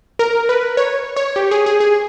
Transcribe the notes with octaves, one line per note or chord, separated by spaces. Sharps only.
A#4
B4
C#5
C#5
G4
G#4
G#4
G#4